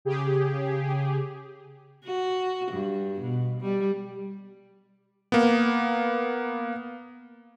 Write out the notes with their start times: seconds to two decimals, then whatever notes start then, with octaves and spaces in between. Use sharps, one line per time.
0.05 C#3 G4 G#4
2.05 F#4
2.72 G2
3.21 B2
3.61 G3
5.32 A#3 B3